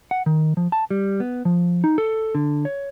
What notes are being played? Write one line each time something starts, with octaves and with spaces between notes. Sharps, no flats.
F#5
D#3
F3
A5
G3
B3
F3
D#4
A4
D3
C#5